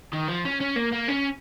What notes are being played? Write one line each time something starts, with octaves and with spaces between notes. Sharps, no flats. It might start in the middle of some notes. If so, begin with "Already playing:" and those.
D#3
F3
C#4
C#4
A#3
A#3
C#4